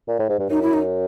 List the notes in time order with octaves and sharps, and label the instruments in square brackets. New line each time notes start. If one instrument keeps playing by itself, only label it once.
[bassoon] A#2
A2
G#2
G2
[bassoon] F#2 [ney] D#4
[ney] E4
D#4